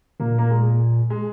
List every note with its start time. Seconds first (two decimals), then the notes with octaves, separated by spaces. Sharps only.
0.20 A#2 A#3
0.38 A#3
0.51 G#3
1.10 G#3